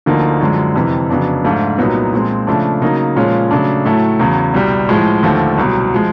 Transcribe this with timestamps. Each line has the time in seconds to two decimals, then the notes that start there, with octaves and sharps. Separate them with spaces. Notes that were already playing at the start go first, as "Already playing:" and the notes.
0.06 D2 D3 F3 A#3 D#4
0.41 F#2 D3 F3 G#3
0.76 F2 C3 E3
1.10 F2 C#3 F#3 B3 D4
1.44 G#2 F3 A3 D4 F4
1.78 C2 A#2 F#3 B3 D#4
2.13 A#2 F3 G#3 C4
2.47 C#3 F3 A3 D4
2.82 C#3 F#3 A#3 D#4
3.16 A#2 F3 G#3 C#4 F4
3.51 C#3 F#3 A3 D4
3.85 A2 F#3 A3
4.20 E2 C#3 F#3
4.54 C2 B2 G3
4.89 A2 F3 G#3
5.23 D#2 D3 F3 A3
5.58 C2 B2 F#3
5.94 F3 G#3